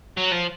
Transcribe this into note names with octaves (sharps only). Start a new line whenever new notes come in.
F#3
F3